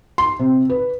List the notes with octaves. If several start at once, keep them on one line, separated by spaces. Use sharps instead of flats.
C6
C3
B4